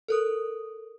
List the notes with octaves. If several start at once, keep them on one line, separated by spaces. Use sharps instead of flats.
A4 A#4 D#6